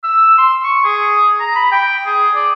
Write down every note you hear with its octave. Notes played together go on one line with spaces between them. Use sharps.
E6
C6
C#6
G#4
A#5
B5
G5
G#4
D5